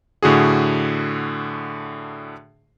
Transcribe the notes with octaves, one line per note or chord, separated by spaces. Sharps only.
A2 D3 F#4 G#4